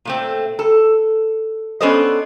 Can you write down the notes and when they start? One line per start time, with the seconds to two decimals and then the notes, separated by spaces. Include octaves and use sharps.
0.05 A#2 A3 C4
0.59 A4
1.81 B3 C#4 D4 A4 C5 D#5